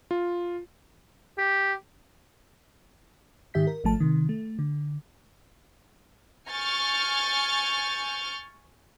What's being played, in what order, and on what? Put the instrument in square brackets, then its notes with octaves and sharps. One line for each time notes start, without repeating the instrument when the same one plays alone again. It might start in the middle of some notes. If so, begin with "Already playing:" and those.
[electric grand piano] F4
[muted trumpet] G4
[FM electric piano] G#2 D#3 G4 E5 G6 B6
A#4
G#1 F3 A3 A5
C3 D#3
A3
D3
[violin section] G#5 C#6 F6 G6 A6